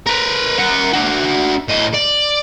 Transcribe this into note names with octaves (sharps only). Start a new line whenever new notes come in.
A#4 B4
A#4 F#5
D4 F#4
A2 D#5
D5